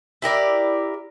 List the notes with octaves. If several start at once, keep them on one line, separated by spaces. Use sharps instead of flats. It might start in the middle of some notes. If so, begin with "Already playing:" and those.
E4 G4 A#4 D5